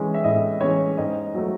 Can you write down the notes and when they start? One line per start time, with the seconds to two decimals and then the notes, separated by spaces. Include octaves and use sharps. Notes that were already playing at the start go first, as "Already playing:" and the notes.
Already playing: E3 G#3 C#4
0.14 E5
0.24 A2 D#5
0.61 E3 G#3 C#4 C#5
0.97 G#2 D#5
1.35 F#3 A3